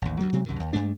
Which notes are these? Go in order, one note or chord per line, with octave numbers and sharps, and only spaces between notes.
A1 D#2
D2 G2 F#3 G#3
C3 F#3 G#3 C4
C2 F#2 C3 D#3
D#2
G2 G#3 A3 D4